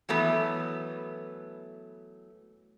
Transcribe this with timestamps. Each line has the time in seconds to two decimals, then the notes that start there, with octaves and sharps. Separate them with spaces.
0.09 E3 F#3 A3 B3